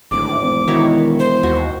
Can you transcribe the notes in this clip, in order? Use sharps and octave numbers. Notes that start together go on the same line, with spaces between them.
D1 G#1 D6
E1
D#3 E4 F#4 C#5
C5
D#2 F#4